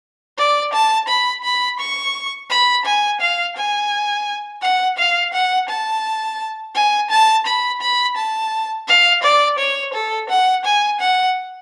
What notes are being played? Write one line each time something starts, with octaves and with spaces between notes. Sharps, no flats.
D5
A5
B5
B5
C#6
B5
G#5
F5
G#5
F#5
F5
F#5
A5
G#5
A5
B5
B5
A5
F5
D5
C#5
A4
F#5
G#5
F#5